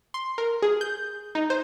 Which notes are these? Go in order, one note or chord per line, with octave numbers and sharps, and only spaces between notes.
C6
A#4
G#4
G6
D#4
C5